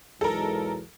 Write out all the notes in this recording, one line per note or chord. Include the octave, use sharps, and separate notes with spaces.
B1 E2 G#3 A4 A#4